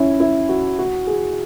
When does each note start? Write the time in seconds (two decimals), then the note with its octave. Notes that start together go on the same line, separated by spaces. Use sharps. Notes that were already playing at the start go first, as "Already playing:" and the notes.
Already playing: C#4 E4
0.20 E4
0.49 F#4
0.79 F#4
1.07 G#4